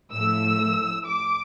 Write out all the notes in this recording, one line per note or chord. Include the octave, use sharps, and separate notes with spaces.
A2 F3 A3 E6
D6